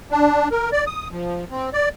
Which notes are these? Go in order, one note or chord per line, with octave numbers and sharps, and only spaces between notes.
D4
A#4
D5
D#6
F3
C4
D5